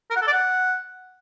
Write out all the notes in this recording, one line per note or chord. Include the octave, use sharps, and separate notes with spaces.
A#4
F#5
A4
D5
F#5